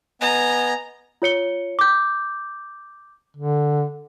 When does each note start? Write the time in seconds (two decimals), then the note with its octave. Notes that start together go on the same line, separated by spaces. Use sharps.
0.21 B3 D#5 G#5 A#5
1.22 F4 C#5 C#7 G7
1.79 D6 G6
3.37 D3